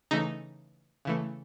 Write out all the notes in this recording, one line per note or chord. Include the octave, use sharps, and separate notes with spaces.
C#3 E3 A3 D#4
C#3 E3 A3